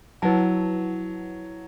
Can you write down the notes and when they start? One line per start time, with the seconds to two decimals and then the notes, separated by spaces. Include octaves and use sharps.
0.22 F#3 E4 B4 F#5 A5